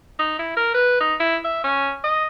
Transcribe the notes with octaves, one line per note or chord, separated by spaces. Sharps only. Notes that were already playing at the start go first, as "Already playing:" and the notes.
D#4
E4
A#4
B4
D#4
E4
E5
C#4
D#5